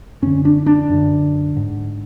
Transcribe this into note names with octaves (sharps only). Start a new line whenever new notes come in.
F#2 D3 C#4
D4
D4
F#2 D3
G#2